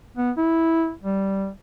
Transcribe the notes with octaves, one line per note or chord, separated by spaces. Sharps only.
B3
E4
G3